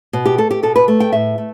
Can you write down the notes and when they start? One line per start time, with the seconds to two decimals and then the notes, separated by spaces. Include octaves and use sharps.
0.13 B2
0.26 G4
0.38 A3 A4
0.51 G4
0.63 B2 A4
0.76 B4
0.88 A3
1.00 G5
1.12 A2 E5
1.38 A3